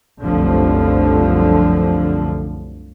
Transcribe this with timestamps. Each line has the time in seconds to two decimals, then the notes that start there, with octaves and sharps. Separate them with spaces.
0.22 F1 C2 F#2 D3 F3